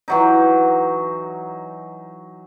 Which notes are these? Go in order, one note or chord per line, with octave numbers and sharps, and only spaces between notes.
E3 F#3 D#4